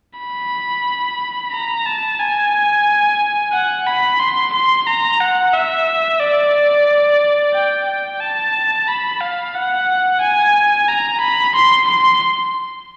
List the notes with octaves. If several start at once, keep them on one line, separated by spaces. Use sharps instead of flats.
B5
A#5
A5
G#5
F#5
B5
C6
C6
A#5
F#5
E5
D5
G5
G5
A5
B5
F5
F#5
G#5
A#5
B5
C6
C6